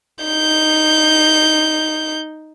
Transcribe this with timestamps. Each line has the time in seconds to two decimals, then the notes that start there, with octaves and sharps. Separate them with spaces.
0.25 D#4 G6